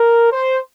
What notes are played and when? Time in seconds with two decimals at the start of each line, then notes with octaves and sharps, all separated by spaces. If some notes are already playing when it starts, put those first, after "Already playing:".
Already playing: A#4
0.31 C5